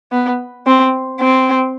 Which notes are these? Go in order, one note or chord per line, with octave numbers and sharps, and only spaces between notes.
B3
C4
C4